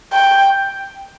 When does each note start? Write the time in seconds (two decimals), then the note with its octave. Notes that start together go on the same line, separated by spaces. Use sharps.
0.13 G5